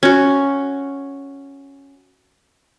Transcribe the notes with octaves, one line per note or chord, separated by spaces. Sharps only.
C#4 F#4